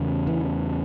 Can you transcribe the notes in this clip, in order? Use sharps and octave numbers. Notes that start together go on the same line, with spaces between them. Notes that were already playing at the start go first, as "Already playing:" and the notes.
Already playing: E2 C#3
E3